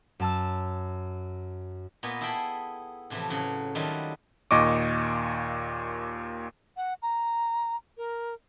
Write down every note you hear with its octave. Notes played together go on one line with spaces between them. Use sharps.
F#2 A5 E6
A#2 B3 F4 D#5 G#5
E4 G#4 A4 E5 G5 B5
A2 C3 E3 F3 A3
A2 C#3 F#3
D#3 F#3 G3 A3 E4 F4
D#2 A#2 D#5 C#6 D6
F#5
A#5
A#4